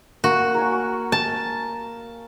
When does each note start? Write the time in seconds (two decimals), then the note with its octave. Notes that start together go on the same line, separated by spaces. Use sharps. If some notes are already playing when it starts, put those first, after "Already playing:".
0.24 A#3 F#4
0.54 A#4 C#5 G#5
1.12 A5